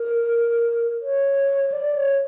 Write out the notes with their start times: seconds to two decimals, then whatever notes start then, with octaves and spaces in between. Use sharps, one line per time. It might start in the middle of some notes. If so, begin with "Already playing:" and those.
Already playing: A#4
1.02 C#5
1.72 D5
1.96 C#5